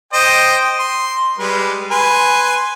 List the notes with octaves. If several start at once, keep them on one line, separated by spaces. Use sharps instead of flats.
C5 D#5 G5
C6
G3 G#3 B4
B4 G#5 C6